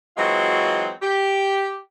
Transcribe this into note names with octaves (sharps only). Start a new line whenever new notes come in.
E3 F#3 G#3 C4 F4 F#4
G4